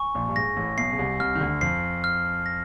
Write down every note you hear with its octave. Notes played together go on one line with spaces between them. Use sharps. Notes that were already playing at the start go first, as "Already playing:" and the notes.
Already playing: G#5 C#6
A#1 A#2
G2
G#2 A#6
A1 A2
B1 B2 C7
C#3
C2 C3
C2 C3 F6
D#3
D2 D3
F2 F3 C7
F6
A#6